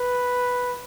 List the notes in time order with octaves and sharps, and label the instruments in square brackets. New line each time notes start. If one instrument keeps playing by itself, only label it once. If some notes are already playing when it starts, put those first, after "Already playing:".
Already playing: [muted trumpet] B4